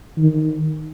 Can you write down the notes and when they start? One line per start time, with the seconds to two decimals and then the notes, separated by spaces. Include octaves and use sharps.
0.18 D#3